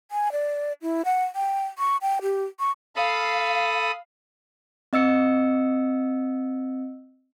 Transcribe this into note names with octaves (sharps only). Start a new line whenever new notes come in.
G#5
D5
E4
F#5
G5
C#6
G5
G4
C#6
A4 F5 B5 D#6
C4 D#5 E6 C#7